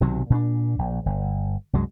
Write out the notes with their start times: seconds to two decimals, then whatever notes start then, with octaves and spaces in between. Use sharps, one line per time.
0.01 B1 C3 D#3 F#3
0.30 A#2 C4 D4
0.79 A#1
1.06 G1
1.73 C2 F#2 F#3 G#3